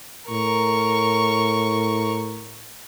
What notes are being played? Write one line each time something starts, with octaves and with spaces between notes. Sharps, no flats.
A2 A#4 C#6